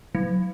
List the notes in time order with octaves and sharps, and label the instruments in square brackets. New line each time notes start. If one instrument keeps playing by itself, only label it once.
[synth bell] F#3